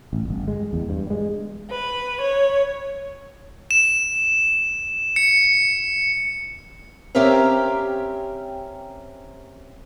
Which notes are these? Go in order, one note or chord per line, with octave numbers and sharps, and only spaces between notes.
A1
G1
G#3
E2
G2
G#3
B4
C#5
E7
C#7
C4 C#4 G4 A#4 E5 F5